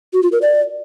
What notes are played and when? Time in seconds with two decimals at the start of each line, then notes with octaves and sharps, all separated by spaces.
0.13 F#4
0.23 F4
0.32 A#4
0.42 D5